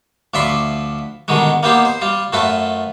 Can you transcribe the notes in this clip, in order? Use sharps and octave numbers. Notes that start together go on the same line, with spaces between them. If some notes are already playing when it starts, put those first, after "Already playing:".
D2 F3 D5 E5 B5 C6
B2 D3 D#3 G3 G#3
A#3 B3 D#4 G4 C5
C5
G3 F4
F#2 A3 F4 A4 B4